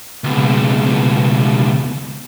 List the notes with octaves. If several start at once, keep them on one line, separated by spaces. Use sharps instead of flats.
C#2 B2